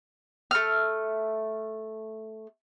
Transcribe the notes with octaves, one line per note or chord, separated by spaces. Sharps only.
A3 F6